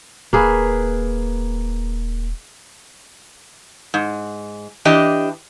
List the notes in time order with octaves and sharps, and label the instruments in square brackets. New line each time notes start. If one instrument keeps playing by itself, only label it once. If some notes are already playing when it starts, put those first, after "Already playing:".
[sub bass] D#1 [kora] A#3 G#4 B4
[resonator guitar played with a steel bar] G#2
E3 D4 G4 D#5